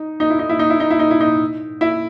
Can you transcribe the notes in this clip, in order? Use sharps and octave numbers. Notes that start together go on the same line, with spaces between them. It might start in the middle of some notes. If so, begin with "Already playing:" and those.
Already playing: D#4
D#4
E4
D#4
E4
D#4
E4
D#4
E4
D#4
E4
D#4
E4